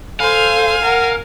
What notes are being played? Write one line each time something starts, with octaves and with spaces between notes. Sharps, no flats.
A4 C5 F5 G#5
A#4 F#5